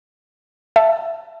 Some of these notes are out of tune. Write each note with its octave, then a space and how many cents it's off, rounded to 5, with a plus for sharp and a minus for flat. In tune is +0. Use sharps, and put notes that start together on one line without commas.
E5 +15 A5 +0